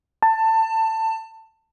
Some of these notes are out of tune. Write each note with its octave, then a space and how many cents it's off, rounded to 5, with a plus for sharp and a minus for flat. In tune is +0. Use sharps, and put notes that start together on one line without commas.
A5 +20